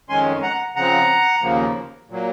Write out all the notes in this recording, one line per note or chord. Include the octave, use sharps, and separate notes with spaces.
F2 D#3 G#3 C#4 G#5 C6
F#5 A#5
C#3 F3 C4 F#5 A#5
D#2 C#3 F3 A#3
A#2 F#3 A#3